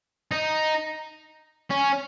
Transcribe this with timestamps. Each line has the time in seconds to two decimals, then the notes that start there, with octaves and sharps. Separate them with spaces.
0.31 D#4
1.70 C#4